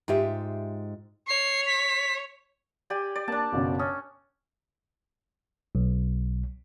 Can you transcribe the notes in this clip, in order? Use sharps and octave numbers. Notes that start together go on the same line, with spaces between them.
G#2 F4 G4 E5
C#5 C7
B6
G4 D5 G#5
D5
A#3 D4 A5
F#1 B2 C#4
C#4 D#6
B1